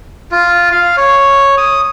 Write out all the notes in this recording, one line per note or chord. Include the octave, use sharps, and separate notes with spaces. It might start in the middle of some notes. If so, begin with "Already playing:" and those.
F4
F5
C#5
D#6